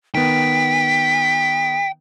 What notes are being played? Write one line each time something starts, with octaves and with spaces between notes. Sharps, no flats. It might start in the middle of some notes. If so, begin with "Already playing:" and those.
D#3 B3 G5 B6